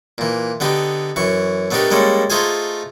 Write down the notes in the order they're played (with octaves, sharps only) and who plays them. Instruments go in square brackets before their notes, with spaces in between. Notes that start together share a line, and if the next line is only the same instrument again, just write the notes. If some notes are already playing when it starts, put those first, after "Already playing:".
[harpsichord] A#2 E3
D3 B3 D#4 G4
F#2 E3 C#6
A3 B3 D4 D#4 G4 A#4
G3 G#3 A#3 C#4 A4
A3 D#4 F4 G#4 C5 G#5